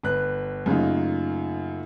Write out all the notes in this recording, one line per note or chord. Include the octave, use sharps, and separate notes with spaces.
G1 B4 F#6
F#2 C#3 A3 A#3 D#4 F4